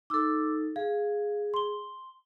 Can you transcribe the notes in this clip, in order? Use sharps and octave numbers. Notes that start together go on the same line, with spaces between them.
D#4 A4 D6 E6
G#4 F5
C6 G7